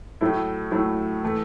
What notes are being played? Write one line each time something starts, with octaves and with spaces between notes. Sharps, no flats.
A2 F#3 A3 E4
A2 F#3 A3 E4
E3 A3